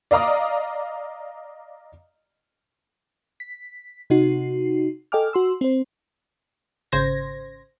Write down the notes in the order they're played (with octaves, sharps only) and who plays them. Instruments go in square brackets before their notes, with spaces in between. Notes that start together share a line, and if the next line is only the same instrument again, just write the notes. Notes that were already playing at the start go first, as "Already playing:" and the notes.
[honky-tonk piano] D5 D#5 F5 A#5 D6 D#6
[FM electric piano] B6
C3 D#4 F#4 C7
A4 D#5 G5 G#5 D6 F6
F#4 C6 E6
C4 C5
[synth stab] G#1 C#3 C5 G#6 A#6